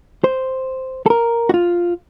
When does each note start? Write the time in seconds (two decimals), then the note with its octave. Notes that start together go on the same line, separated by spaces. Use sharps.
0.24 C5
1.06 A4
1.10 A#4
1.49 F#4
1.54 F4